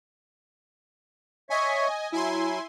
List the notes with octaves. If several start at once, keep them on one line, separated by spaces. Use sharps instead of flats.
C#5 D#5 E5 G#5 C#6
F#3 E4 G#5 C6